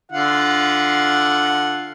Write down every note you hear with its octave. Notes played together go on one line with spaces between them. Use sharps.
D3 F4 F#5